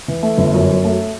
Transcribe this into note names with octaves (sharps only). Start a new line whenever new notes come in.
E3
A3
G1
F#2
F#3
A3